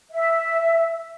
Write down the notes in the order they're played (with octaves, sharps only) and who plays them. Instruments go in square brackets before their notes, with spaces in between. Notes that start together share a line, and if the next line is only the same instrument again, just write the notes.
[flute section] E5